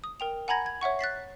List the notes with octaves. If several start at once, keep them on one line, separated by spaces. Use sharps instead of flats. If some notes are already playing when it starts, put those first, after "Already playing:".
D#6
A#4 G5 F7
F#5 G#5 A#5 B5 G#6 A#6
G#6
C#5 E5 F#5 C#6
F#6 A6 B6 C7